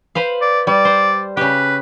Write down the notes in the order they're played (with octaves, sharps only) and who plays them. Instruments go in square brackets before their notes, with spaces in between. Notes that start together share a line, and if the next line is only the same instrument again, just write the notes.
[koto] B4 C5 F5
[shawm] D5
[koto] G3 [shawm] D5
[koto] C5
[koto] C#3 G4 [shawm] B4